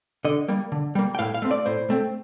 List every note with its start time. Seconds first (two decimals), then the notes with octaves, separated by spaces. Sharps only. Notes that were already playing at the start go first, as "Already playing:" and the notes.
0.25 D3 D#5
0.48 G3 A#3
0.72 D3
0.95 G3 A#3
1.15 G5
1.19 A2 F5
1.34 F5
1.42 A3 C4
1.51 D5
1.66 A2 C5
1.90 A3 C4